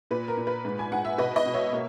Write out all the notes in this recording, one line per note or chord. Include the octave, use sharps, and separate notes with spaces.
A#2 B4
A#4
A#2
B4
G#2
G#5
G#2 F#5
E5
B2 B4 D#5
B4 D#5
B2
C#5 E5
A#3